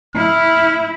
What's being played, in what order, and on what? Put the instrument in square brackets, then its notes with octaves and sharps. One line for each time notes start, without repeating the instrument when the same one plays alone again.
[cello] E4 [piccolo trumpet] F6